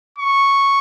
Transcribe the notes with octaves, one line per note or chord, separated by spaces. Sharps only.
C#6